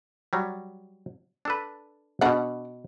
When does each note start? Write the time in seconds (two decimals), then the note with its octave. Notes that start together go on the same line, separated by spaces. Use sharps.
0.33 F#3 G3
1.45 D4 A4 B4
2.21 B2 D4 B4 F#5